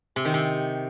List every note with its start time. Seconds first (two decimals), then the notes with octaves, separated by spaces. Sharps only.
0.16 C3
0.25 D#3
0.34 C3